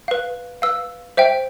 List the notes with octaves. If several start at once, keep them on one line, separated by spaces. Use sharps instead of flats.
B4 F5
B4 F5 E6
C5 E5 G5